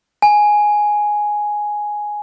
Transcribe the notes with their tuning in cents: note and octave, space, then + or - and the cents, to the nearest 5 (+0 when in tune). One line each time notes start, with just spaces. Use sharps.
G#5 +5